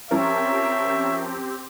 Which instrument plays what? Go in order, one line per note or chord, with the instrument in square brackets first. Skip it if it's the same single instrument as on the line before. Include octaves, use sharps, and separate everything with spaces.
[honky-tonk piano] F3 C#4 A#4 [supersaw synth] C4 G4 [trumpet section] C#5 E5